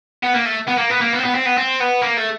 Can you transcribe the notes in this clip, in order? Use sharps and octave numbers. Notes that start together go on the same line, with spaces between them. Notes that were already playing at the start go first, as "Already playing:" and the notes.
B3
A#3
A3
B3
A#3
B3
A#3
B3
C4
B3
C4
B3
C4
B3
A#3
A3